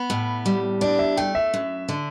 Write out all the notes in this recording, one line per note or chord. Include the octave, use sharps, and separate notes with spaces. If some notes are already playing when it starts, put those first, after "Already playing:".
Already playing: B3
A2
G3
D4 D5
E5
A3 G5
E5
F#2
D3